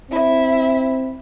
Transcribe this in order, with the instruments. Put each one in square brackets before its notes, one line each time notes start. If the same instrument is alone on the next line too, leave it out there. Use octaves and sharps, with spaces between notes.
[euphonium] C4 [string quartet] E4 E5